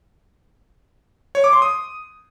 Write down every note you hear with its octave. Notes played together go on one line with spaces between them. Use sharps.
C#5
D6
C6
D#6